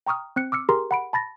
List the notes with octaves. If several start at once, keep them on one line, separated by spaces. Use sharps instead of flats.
G5 A#5 C#6 D#6 F6
C4 F#6 C#7
D6 E6 F6 C#7
G4 G#4 A#4 A#5 C6
F#5 B5 D7
A5 B5 A6 A#6